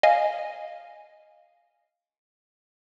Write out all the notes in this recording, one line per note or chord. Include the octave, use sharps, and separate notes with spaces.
D#5 F5 G#5